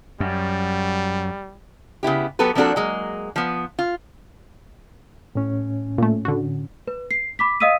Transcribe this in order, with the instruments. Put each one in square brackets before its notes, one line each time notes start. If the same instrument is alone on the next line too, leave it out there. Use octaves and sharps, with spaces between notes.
[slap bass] F#2 [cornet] G3
[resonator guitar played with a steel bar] C#3 B3 E4 G4
F#3 B3 G4 A4 B4
F3 A#3 C4 D4 F#4 A4
F#3 G#3 A#3
F3 B3
F4
[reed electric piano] A2 C#4
[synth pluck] A#2 A3
D3 F#4
[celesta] B4
C7
B5 D6 B6
D#5 F5 D#6 E6 B6 D#7